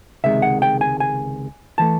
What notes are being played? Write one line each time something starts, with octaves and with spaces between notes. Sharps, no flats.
C#2 C3 D#3 G#3 E5
F#5
G5
G#5
G#5
E3 A3 A5